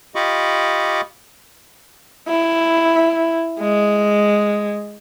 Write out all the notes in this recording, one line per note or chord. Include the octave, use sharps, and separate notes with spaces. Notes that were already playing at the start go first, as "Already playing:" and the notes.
F4 G4 D#5 B5 C#6 D6
E4
G#3